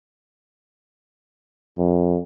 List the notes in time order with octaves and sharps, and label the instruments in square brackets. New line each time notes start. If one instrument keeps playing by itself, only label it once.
[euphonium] F2